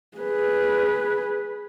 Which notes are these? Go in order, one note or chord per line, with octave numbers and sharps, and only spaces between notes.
G#4 B4